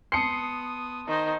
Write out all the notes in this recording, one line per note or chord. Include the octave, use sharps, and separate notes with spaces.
B3 A5 C6 D#6 C7 C#7
D#3 D#4 C5